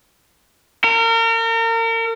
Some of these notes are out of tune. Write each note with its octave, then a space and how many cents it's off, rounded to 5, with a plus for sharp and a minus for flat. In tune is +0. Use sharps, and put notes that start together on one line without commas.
A#4 -35